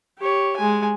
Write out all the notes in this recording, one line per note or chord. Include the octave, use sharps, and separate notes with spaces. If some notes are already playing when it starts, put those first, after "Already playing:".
G4 C#5
G#3 G#5